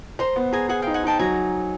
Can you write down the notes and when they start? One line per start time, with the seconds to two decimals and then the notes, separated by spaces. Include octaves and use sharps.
0.19 C5 A#5 C6
0.36 B3
0.52 G#4 G#5 A#5
0.69 G#4 F#5 G#5
0.82 D#4 F5 G5
0.94 F#5 G#5
1.03 D#4 G5 A5
1.19 F#3 G#5 A#5